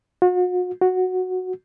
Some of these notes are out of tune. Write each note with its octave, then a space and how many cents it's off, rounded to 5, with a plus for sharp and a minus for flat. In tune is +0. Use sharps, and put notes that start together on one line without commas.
F#4 -40
F#4 -5